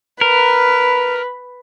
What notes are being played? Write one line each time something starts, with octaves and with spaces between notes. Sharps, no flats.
A#4 B4